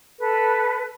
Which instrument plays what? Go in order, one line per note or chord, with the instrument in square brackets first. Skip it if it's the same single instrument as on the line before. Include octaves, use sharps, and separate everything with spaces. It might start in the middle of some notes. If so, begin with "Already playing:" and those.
[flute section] A4 B4